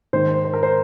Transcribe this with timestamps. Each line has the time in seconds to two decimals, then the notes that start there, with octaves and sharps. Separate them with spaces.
0.13 G#2 D#3 C5
0.45 C5
0.53 A#4
0.63 C5